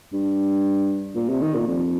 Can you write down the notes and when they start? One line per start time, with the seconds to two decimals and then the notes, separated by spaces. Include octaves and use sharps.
0.13 G2
1.15 A#2
1.29 C3
1.41 D#3
1.55 A#2
1.67 F2